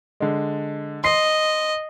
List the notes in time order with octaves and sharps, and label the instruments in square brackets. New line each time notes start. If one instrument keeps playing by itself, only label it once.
[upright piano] D3 G#3
[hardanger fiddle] D#5 [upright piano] C6 C7